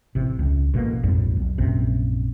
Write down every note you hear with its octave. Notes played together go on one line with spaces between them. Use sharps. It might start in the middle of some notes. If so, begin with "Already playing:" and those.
A1 C3
C#2
A1 B2 A3 A#3
A#1 F2 G#2 G3
B1
A#1 F#2 C3